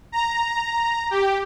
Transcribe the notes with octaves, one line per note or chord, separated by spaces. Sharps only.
A#5
G4